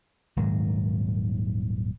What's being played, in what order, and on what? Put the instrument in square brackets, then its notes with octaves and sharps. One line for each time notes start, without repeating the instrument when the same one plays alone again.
[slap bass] D#1 G#2 D#3 F#3